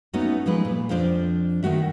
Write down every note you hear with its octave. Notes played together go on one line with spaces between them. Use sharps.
A3 B3 C#4 D#4 F#4
F3 G#3 A3 D#4 B4
A#2
F2 F3 D4 F4 C5 D5
D#3 A3 F#4 E5